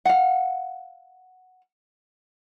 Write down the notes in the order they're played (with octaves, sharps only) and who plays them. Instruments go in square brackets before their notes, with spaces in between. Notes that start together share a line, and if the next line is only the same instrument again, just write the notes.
[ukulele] F5 F#5